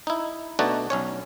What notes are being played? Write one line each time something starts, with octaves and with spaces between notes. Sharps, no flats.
D#4 E4
B2 A3 D4 D#4 F#4 D5
B1 C#4 C#5